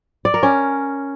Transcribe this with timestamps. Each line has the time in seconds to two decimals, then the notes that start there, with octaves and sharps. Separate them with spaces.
0.25 D5
0.34 A#4
0.43 C#4